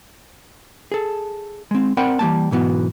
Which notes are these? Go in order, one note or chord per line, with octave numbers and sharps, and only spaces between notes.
G#4 A4
G#3 C4
C4 A#4 D5 F#5 G5 B5
E3 G3 A#3 A5
B1 G#2 E3 B3 F#4